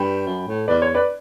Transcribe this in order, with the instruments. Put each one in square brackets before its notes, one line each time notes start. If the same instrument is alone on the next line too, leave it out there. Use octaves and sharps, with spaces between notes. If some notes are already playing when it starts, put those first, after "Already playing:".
Already playing: [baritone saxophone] G2 [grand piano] G5 B5
[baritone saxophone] F#2
A2
[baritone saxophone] E2 [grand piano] B4 D5
[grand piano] C#5
B4 D5